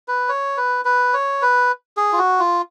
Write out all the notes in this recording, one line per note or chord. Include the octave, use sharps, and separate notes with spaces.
B4
C#5
B4
B4
C#5
B4
G#4
F4
F#4
F4